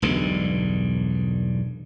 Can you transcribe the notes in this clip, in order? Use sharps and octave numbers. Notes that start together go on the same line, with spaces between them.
E1 B1 G2 D3